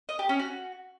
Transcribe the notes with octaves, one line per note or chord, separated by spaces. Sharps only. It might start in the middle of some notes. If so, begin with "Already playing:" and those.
D#5
G4
C#4
F#4